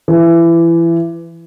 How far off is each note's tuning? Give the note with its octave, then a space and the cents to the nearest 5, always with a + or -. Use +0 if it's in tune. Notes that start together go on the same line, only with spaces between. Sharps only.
E3 +25